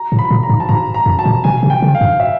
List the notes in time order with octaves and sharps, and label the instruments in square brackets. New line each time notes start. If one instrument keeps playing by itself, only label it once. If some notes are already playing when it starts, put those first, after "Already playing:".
Already playing: [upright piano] A#5
[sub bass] A2
[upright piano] B5
[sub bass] A#2
[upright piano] A#5
[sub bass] G#2
[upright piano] A5
[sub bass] G#2 [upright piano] A#5
[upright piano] A#5
[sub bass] F#2
[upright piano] A5
[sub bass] A#2
[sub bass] B2 [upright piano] G#5
[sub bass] C3
[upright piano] G5
[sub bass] C#3
[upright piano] F5
[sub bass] G2
[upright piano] E5